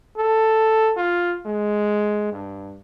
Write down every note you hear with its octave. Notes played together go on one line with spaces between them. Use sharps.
A4
F4
G#3
G2